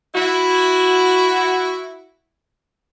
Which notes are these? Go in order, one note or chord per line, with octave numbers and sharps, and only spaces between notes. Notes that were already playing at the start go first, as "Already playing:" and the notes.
E4 F#4